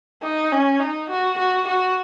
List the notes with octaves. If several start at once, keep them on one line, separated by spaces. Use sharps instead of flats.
D#4
C#4
D#4
F#4
F#4
F#4